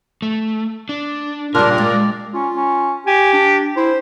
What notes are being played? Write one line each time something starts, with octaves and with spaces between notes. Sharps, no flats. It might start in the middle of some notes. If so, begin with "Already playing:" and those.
A3
D4
A#2 C#3 G3 D4 F4 A#4 F6
G#3 D5
C#4 F4
C#4
G4 G#5
D4
E4 C5